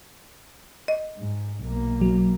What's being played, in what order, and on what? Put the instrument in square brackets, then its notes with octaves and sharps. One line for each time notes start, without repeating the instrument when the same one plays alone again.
[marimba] D#5
[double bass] G#2
B1 A#3
[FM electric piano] F#3